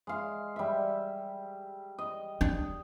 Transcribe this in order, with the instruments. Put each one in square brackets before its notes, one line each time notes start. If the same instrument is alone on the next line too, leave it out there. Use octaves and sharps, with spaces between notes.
[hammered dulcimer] G#3 F5
G3 E5
D#5
[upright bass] D4